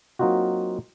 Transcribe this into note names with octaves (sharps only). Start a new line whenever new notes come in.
F#3 A#3 C4 D#4 F4 F#4